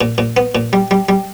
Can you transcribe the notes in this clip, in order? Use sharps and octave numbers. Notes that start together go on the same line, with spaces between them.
A#2
A#2
B3
A#2
G3
G3
G3